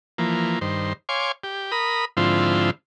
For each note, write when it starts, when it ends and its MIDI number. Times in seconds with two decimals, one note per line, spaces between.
0.18 0.59 52
0.18 0.59 53
0.18 0.59 58
0.61 0.93 43
0.61 0.93 51
0.61 0.93 72
1.09 1.32 73
1.09 1.32 77
1.09 1.32 80
1.09 1.32 84
1.09 1.32 86
1.44 1.71 67
1.72 2.05 70
1.72 2.05 83
1.72 2.05 87
2.17 2.71 44
2.17 2.71 50
2.17 2.71 53
2.17 2.71 60
2.17 2.71 64
2.17 2.71 65